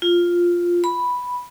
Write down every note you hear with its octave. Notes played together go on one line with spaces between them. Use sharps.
F4
B5